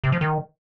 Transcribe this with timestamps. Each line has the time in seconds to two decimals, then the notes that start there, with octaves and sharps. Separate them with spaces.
0.04 C3
0.12 F3
0.21 D#3